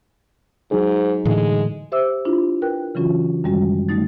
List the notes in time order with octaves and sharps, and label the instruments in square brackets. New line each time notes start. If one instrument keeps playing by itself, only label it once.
[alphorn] G#2 [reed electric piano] F#3 D#4 G#4
[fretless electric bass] A2 D3 E3 [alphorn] G#3
[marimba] G4 C5 E5 D6 E6
D4 E4 F4
A#4 B4 G5 F#6
C#3 E3 F#3 C#4 F4 F#4
F#2 D#3 G3 G#3 C#4 F#4
D3 G3 A3 D#4 A6